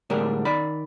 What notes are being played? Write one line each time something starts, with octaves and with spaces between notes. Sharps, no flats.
A2 D3 G3 G#3 D4 A#4
D#3 D5 B5